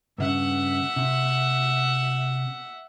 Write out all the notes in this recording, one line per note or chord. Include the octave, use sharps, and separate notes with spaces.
G2 C#3 E5 F#5
C3